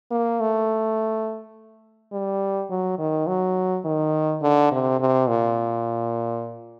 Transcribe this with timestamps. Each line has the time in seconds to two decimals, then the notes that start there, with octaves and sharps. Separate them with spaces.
0.11 A#3
0.40 A3
2.12 G3
2.70 F#3
2.99 D#3
3.27 F#3
3.85 D#3
4.42 D3
4.72 C3
5.00 C3
5.28 A#2